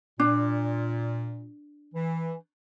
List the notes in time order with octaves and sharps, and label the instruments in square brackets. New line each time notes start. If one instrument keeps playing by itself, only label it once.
[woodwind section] A#2 [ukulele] D4
[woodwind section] E3